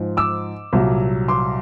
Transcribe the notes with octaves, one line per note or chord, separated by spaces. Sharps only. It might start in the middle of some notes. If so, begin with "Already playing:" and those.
Already playing: G#2 F3
D6 E6
C2 A#2 F#3
C6 D6